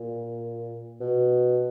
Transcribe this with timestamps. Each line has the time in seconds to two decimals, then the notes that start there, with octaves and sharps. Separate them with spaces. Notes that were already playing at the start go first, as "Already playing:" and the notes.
Already playing: A#2
1.00 B2